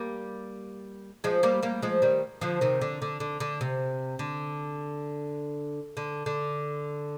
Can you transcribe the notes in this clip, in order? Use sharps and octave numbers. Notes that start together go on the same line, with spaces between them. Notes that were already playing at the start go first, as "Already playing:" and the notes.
Already playing: G3 A#3
F3 G#3
G3 A#3
G3 A#3
F3 G#3
D#3 G3
D3 F3
C3 D#3
D3
D3
D3
D3
C3
D3
D3
D3